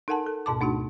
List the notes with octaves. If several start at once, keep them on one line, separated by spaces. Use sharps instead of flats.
D#4 A4 A#4 F#5 G#5 A5
A4
D2 G#2 B2 A5 D6
A3 D4 D#4 F#4